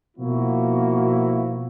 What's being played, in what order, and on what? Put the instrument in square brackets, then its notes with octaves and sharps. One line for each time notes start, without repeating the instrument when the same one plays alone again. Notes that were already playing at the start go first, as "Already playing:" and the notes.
[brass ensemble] B2 F3 A#3 E4 F#4